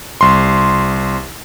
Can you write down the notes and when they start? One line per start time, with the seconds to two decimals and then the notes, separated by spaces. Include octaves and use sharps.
0.21 C2 C6